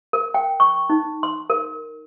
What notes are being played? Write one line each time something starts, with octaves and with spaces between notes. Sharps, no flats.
A#4
G5
C#6
D#4
C6
A#4